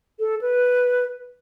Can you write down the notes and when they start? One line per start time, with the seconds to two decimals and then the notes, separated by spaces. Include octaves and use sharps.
0.19 A4
0.41 B4